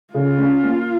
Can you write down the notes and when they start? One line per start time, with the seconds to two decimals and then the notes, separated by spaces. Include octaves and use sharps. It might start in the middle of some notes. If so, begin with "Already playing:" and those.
0.14 C#3 F4
0.38 C#4
0.63 A#3